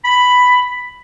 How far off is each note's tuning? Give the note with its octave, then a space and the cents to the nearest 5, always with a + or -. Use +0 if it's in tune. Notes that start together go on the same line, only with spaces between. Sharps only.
B5 +5